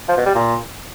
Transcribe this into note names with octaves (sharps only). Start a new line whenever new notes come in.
F3
B2
G3
A#2